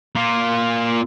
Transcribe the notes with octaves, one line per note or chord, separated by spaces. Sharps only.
A#3 F4